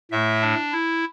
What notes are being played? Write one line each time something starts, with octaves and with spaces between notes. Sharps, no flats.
A2 A3 E5
D4
E4